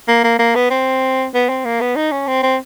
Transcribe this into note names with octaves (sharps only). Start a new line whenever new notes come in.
A#3
A#3
A#3
B3
C4
B3
C4
A#3
B3
D#4
C#4
C4
C4